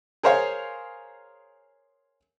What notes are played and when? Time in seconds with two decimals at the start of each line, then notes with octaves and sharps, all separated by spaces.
0.23 G#4 A#4 C5 C#5 F5